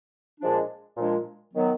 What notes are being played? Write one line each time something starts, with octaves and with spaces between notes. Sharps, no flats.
A#2 F3 G#3 D4
A#2 F3 G#3 D4
D#3 F#3 B3